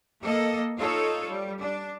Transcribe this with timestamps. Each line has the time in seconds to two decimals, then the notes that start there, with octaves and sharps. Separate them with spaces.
0.22 A#3 A4 D#5
0.79 D#4 F4 A4 C#5
1.29 G3
1.62 D4